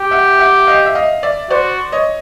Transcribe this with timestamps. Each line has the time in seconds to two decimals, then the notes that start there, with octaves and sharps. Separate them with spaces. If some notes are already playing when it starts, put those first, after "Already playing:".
Already playing: G4
0.11 E5 F#5
0.39 E5 F#5
0.67 D#5 F5
0.86 E5
0.95 D#5 F5
1.23 D5 E5
1.50 F#4 C5 D5
1.92 C#5 D#5